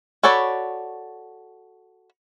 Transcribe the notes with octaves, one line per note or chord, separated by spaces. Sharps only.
F#4 A4 C#5 D5 B5